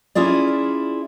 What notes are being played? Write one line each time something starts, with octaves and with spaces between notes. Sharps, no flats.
C#4 E4 F4 G#4 D5